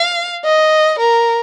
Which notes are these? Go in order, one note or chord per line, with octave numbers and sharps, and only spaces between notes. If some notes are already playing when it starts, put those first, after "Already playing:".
Already playing: F5
D#5
A#4